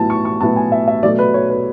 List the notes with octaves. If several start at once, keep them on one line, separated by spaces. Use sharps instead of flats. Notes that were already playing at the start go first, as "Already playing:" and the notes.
Already playing: A2 F#3 B3 E4 A5
C#6
C#6
A2 F#3 B3 E4 A5
G#5
E5
E5
B2 F#3 A3 D5
B4
C#5
B4